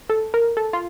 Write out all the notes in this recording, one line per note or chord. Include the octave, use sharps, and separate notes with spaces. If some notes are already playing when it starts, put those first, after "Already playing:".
A4
A#4
A4
F4